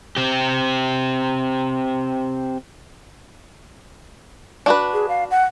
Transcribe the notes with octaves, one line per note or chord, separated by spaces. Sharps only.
C4 G4
D4 F#4 B4
G#4
F5
F#5